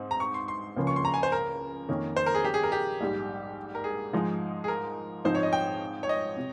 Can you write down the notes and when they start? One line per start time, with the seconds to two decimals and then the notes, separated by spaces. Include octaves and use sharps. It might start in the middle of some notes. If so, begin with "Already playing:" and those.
Already playing: G#2 C4 D#4
0.11 A#5
0.20 C#6
0.34 C6
0.48 C6
0.76 C#2 C#3 F3 A#3 C#4
0.87 C#6
0.96 C6
1.05 A#5
1.14 G#5
1.23 C5
1.32 A#4
1.88 F2 D#3 A#3 C#4
2.16 C5
2.26 A#4
2.35 G#4
2.45 G4
2.54 G#4
2.63 A#4
2.72 G4
3.01 A#1 G#2 G3
3.75 A#4
3.84 G#4
4.13 G#2 F3 G#3 D#4
4.64 G#4
4.68 A#4
5.25 G#2 F3 C4 D#4 C5
5.35 C#5
5.43 D#5
5.53 G5
6.03 C#5
6.09 D#5
6.37 C3